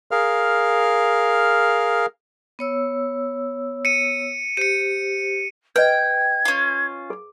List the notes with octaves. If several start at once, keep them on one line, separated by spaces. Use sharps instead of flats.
G#4 A#4 F5 F6
B3 C#5 E6
C#7 D#7
G4 C5 C#7 D#7
B4 D#5 G5 G#6
C#4 F4
G#4